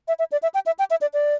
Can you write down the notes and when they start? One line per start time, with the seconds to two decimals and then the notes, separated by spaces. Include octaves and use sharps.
0.08 E5
0.19 E5
0.32 D5
0.43 E5
0.54 G5
0.66 E5
0.79 G5
0.90 E5
1.01 D5
1.14 D5